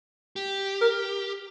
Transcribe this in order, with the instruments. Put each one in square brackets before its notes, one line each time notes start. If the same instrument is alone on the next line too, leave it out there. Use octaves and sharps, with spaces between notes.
[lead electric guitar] G4
[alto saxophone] A#4